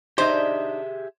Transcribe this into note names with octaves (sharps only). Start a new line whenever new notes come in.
D4 D#4 G4 G#4 C5 D#5 E5